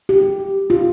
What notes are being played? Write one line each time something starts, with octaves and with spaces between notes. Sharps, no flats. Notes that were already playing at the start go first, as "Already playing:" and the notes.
G4
F4